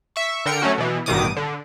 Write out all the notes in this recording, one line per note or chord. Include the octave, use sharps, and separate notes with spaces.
E5 C#6
D3 A#4 G5 C#7
F#3 A3 C#4 F#4
B2 E3
A1 G2 B2 D#3 D6 D#6
D3